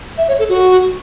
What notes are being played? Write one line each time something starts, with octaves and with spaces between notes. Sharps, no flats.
E5
C#5
A4
F#4